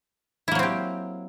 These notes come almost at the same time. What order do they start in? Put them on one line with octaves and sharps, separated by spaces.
E4 A#3 F#3 C4 G4